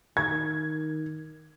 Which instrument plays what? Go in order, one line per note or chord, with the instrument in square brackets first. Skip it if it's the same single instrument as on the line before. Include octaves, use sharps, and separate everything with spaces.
[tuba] D#3 [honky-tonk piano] G#6